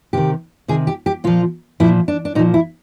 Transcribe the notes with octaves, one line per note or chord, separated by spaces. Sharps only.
C3 D#3 G4
C3 D#3 G#4
G4
G4
A#2 F3 F4
A#2 F3 E4
D4
D4
A#2 F3 D#4
E4